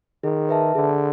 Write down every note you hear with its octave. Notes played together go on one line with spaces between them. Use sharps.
D#3 G#4
B4 E5 A5
D3 G#4